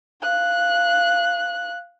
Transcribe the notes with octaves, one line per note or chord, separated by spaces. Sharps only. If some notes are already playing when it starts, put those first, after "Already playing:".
F5 F#6